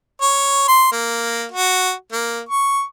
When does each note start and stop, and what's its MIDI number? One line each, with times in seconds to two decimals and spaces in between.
0.21 0.66 73
0.68 0.90 84
0.92 1.46 58
1.51 1.92 66
2.12 2.41 58
2.49 2.83 85